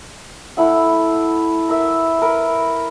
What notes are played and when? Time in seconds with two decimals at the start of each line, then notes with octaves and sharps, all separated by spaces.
0.57 A3 E4 F#5
1.69 A#4 E5
2.22 A#4 B4